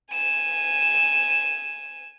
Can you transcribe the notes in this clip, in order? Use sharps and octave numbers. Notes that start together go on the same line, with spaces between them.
G#5 E7